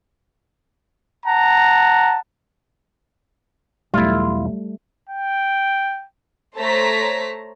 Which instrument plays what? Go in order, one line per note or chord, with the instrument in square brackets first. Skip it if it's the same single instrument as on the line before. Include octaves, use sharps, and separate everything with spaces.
[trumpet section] F#5 A5 A#5
[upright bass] B1 E2 [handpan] G3 A3 [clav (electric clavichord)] E4 F4
[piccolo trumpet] G5
[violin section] A3 C5 C#5 A5 A#5 B6